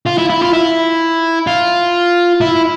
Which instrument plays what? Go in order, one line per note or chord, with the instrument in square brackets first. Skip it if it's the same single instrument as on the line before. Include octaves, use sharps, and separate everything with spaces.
[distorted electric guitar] F4
E4
E4
F4
E4
F4
E4